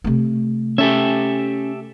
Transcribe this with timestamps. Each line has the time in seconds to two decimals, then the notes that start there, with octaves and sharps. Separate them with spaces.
0.04 C3 A3
0.78 C#4 G4 A4 E5